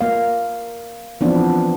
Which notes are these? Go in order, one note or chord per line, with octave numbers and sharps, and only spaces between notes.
A#3 F5
E3 F3 B3 C4 D4